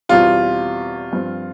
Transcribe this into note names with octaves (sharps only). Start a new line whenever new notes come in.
E2 B2 G3 C4 F4 G4
G2 F3 C4